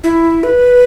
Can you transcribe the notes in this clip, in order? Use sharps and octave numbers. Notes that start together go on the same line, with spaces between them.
E4
B4